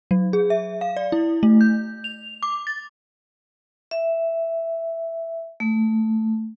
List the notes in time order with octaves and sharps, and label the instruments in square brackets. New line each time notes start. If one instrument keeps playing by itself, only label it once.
[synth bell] F#3
G#4
E5
F5
D5
E4
A3
G6
F7
D6
A6
[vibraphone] E5
A3